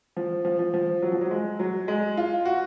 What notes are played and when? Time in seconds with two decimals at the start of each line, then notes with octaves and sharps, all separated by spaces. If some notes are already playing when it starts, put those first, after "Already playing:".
0.17 F3
0.45 F3
0.59 F3
0.74 F3
1.02 F#3
1.12 F3
1.21 F#3
1.31 G#3
1.59 F#3
1.88 G#3
2.17 F4
2.45 F#4